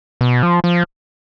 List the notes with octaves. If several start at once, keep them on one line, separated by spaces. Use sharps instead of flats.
B2
F3
F3